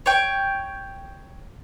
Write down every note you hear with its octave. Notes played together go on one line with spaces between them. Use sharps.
C#5 G5